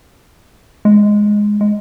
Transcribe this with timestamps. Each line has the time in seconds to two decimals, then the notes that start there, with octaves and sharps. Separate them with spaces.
0.85 G#3
1.61 G#3